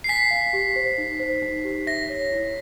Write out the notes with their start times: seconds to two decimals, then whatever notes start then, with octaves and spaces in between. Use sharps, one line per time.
0.04 C7
0.09 G#5 B6
0.31 F5
0.53 G4
0.76 C5
0.98 D#4
1.20 C5
1.43 D#4
1.64 G4
1.87 E5 A#6
2.09 C#5
2.32 E4